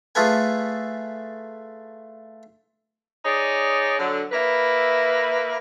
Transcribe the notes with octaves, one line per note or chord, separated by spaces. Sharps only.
A3 F4 G#4 A4 B4 G#5
D#4 G#4 C#5 D5
D3 F#3
A#3 E4 B4 E5